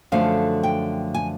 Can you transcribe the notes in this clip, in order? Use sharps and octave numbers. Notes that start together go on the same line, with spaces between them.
F#2 D3 F3 A3 F5
G5
G#5